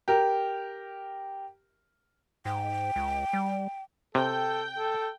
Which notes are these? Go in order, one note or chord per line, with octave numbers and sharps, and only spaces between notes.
G4 A#4
G#2 G5
C#2
G3
C3 A4 G5
A4